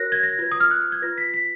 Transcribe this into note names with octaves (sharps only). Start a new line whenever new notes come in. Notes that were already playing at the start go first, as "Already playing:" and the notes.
Already playing: F#4 A#4 C#5 F#6 A#6
G#6
A#6
F4 B4 G#6
D#6
F6
F#6
F6
G#6
F4 B4 A#6
B6
B6